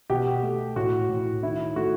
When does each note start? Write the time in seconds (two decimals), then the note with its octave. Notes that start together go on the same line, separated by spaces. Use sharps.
0.10 B2 G4
0.43 A3
0.76 A2 F#4
1.09 A2
1.43 D#3 E4
1.76 A3 F#4